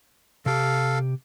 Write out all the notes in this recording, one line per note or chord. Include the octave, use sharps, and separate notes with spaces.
C3 G4 A4 F5